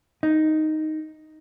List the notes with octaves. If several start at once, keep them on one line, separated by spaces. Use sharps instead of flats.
D#4